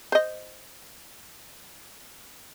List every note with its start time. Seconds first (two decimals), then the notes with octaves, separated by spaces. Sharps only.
0.12 C5 D#5